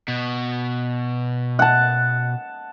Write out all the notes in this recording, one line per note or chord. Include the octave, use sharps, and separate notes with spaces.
B2
F#5 A5